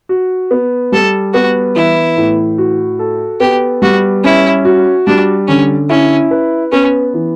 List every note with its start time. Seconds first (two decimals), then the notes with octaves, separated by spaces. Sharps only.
0.09 F#4
0.51 B3
0.92 G3 A4
1.34 B3 F#4
1.75 E3 E4
2.17 A2
2.58 F#4
2.99 A4
3.40 B3 G4
3.82 G3 F#4
4.24 C#4 E4
4.65 F#4
5.07 G3 D4
5.48 D3 C#4
5.89 C#4 E4
6.31 B4
6.72 B3 C#4
7.14 E3